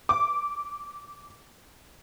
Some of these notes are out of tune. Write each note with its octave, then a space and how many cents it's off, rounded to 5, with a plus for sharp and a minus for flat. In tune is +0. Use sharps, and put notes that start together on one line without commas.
D6 -15